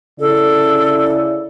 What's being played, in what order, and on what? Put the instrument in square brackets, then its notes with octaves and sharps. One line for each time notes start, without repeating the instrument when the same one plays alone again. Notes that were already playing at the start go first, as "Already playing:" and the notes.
[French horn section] C#3 E4 D5 [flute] A4